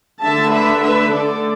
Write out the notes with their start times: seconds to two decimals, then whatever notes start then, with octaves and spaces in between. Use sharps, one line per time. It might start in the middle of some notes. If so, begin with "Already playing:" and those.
0.22 D3 A3 D4 E5 A5
0.52 B4 E5
0.82 B4 E5
1.12 D3 A3 D4 A4 D5